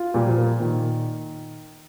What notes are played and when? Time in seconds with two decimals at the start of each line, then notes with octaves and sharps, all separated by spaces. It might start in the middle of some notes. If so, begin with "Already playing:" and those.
Already playing: F4
0.14 A#2 G3
0.26 F3
0.38 A#3
0.60 A#2 D#3